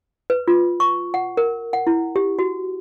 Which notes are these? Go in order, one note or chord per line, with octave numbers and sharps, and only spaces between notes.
B4
F4
C#6
F#5
A#4
F#5
E4
G4
F#4